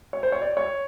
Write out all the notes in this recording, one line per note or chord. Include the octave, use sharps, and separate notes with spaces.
C#5
C5
C#5
D5
C#5